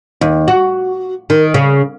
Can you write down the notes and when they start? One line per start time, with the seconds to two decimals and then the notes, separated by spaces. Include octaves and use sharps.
0.21 D#2
0.48 F#4
1.30 D#3
1.54 C#3